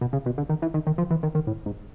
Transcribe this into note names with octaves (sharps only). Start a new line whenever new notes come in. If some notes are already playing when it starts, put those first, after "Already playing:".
B2
C#3
B2
D3
D#3
E3
D#3
D#3
F3
E3
D#3
D#3
A2
G#2